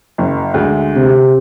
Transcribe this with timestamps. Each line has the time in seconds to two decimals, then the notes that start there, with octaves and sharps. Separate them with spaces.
0.18 F#1
0.54 D2 G#3
0.96 C3